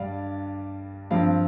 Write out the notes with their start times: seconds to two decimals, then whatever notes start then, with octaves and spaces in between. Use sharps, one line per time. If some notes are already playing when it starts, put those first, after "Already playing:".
Already playing: G2 G3 D4 D5 F5
1.11 G2 F3 C4 F5